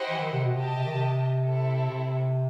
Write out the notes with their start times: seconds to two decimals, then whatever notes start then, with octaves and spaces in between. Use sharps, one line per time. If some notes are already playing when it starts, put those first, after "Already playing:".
Already playing: E4 G4 C5 D#5 F#5
0.10 E3
0.21 D#3
0.33 C3
0.44 B2
0.54 C3 G4 D#5 A5
0.77 C3
0.85 D#3
0.94 C3
1.44 C4 E4 A4
1.89 C3